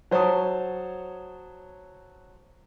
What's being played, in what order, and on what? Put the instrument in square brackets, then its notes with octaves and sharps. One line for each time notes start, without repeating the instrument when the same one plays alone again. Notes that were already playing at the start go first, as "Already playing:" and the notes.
[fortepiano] F#3 C5 C#5 A5 D#6